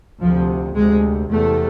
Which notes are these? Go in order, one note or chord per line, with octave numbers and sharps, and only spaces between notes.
D2 C3 F3
D2 C3 G#3
E2 C3 A3